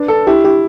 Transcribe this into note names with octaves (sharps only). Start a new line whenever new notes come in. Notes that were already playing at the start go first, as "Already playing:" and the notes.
Already playing: D4 B4
A4
E4 G4
E4 G4